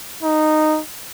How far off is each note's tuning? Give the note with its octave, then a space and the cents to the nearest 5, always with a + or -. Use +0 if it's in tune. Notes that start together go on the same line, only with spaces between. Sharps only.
D#4 -10